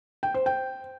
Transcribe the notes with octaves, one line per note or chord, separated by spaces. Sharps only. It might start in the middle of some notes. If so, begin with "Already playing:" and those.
G5
C5
G5